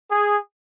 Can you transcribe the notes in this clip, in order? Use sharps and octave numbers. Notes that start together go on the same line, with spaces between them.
G#4